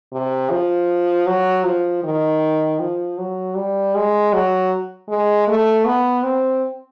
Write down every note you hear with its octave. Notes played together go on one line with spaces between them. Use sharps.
C3
F3
F#3
F3
D#3
F3
F#3
G3
G#3
F#3
G#3
A3
B3
C4